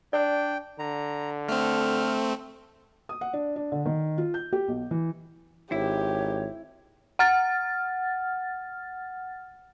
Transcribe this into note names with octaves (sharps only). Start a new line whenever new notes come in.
D4 D5 G5
D3 A#5
A3 C4 F6
D#6
F#5
D4
D4
D3
D#3
F4
G6
G4
B1
E3
G#1 E4 G4 C#5
F#5 F6 A6